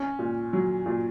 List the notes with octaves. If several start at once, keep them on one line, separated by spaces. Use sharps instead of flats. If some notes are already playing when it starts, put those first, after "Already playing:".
Already playing: C#4
A#2
F#3
A#2